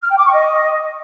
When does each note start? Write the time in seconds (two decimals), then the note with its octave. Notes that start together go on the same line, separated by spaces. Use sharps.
0.02 F6
0.10 G5
0.17 D6
0.25 C#6
0.33 D#5